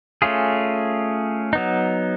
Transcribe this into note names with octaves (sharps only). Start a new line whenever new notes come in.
A3 C#4 F4 G#4
F#3 B3 D#4